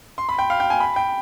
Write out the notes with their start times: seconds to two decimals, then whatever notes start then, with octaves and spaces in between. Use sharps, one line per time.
0.18 C6
0.29 B5
0.39 G5
0.50 F5
0.60 G5
0.70 G#5
0.80 B5
0.96 G5